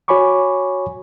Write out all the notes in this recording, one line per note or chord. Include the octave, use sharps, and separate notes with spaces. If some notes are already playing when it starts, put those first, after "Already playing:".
F#4 C#5 G#5 B5 C#6 D6